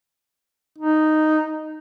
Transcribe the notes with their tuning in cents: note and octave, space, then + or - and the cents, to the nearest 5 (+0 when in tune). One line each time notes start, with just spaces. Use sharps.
D#4 -5